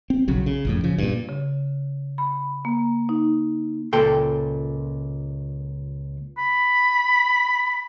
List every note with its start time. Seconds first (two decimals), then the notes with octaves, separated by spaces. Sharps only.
0.10 C4
0.28 B1 C#3 F#3
0.46 C#3
0.65 A1 F2 A2
0.84 C#3 F3
0.98 G2 A#2
1.29 C#3
2.18 B5
2.65 A#3
3.09 D#4
3.93 C#2 A#2 A4 G5 C6
6.38 B5